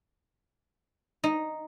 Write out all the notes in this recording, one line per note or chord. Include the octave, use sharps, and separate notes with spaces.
D#4